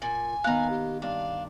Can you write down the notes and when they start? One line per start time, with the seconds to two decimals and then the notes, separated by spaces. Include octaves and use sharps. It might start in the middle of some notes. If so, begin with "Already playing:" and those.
0.02 A#2 G#5
0.44 D#3 B3 F5 A#5 F#6
0.70 G4
1.02 G2 D4 F5